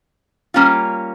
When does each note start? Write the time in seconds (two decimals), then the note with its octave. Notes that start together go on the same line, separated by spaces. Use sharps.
0.54 G3 A#3 C#4 F4